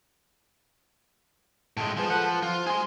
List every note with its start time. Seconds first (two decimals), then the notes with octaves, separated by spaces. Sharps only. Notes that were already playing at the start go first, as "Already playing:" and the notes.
1.77 A2 G#3
1.97 F3 G#3 B3
2.10 A4 B4 F#5
2.43 F3 F4
2.67 G#4 C6